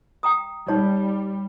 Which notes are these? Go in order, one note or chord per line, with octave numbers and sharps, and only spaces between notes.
G5 A#5 D#6
G3 D#4 C#5